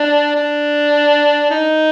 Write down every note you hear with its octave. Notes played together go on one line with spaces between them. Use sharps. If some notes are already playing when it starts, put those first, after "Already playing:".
Already playing: D4
D4
D#4